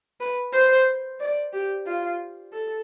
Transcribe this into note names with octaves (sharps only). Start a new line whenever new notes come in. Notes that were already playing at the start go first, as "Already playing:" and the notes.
B4
C5
D5
G4
F4
A4